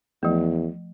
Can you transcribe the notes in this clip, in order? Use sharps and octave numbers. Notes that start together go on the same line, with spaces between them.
E2 F3 A3